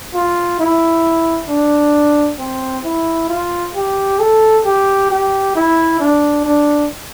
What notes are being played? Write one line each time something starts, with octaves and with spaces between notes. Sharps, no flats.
F4
E4
D4
C4
E4
F4
G4
A4
G4
G4
E4
D4
D4